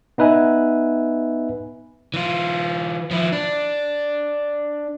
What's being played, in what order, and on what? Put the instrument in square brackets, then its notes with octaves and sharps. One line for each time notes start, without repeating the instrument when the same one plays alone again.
[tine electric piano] B3 D#4 B4 E5 G#5
[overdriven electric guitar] E3 F4
F3 E4
D4